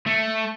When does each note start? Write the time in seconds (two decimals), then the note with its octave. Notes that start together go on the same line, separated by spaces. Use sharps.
0.07 A3